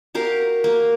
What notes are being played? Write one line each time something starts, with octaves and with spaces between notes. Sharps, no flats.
F#4 G4 A#4 F5
A#3